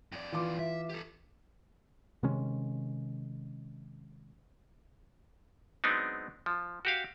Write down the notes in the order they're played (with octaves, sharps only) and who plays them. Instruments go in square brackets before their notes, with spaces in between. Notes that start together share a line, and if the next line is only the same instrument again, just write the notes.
[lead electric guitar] F2 D5
[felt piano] E3 F4 D6
[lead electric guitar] E5
G4 A4
[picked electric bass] C3 D#3 G#3 C#4
[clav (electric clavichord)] F#3 G#3 B3 C4 D4 D#4
F3
F#4 G4 F5